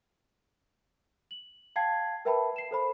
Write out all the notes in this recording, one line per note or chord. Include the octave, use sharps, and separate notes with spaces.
F#7
F5 G5 A5 G#6 C7
A#4 B4 E5 G5 A5 B5
C7 E7
A4 C5 B5